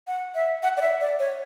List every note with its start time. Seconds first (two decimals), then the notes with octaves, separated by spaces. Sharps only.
0.07 F#5
0.35 E5
0.63 F#5
0.77 D5
0.81 E5
1.01 D5
1.19 C#5